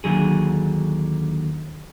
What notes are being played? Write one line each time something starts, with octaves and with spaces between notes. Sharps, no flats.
D#2 D3 F#3 G#4